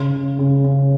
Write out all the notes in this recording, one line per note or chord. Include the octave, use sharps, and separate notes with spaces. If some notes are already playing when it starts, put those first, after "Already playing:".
Already playing: C#3
C#3
C#3
C#3